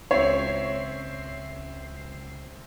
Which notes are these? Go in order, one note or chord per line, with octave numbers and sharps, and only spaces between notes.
C#2 C4 C#5 E5 C7